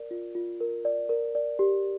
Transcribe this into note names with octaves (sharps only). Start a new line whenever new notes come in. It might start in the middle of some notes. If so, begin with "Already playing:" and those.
Already playing: A#4 D5
F4
F4
A#4
D5
A#4
D5
G4